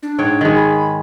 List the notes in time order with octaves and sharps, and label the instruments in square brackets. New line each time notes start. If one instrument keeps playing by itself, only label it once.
[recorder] D4
[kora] G#2 C#5 G5
D#3 G#3
[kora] G#4 [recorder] B5